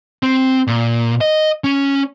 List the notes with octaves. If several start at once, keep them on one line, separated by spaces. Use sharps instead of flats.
C4
A#2
D#5
C#4